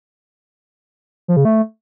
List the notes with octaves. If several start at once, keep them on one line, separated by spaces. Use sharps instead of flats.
F3
C#3
A3